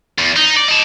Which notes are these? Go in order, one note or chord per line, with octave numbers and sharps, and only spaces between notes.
E2
D#4
D5
D#5 A5